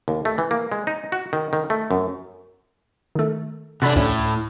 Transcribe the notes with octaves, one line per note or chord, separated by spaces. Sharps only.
D#2
A3
E3
A#3
G#3
D#4
F#4
D#3
D#3
A3
F#2
D#3 A3
C3 D4 F#4 A4 B5
D2 A2 C#4